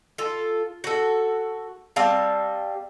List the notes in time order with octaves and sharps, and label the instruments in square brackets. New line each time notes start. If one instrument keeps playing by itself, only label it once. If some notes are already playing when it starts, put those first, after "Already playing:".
[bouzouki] F4 A4
F#4 A4
G3 C4 F5 A5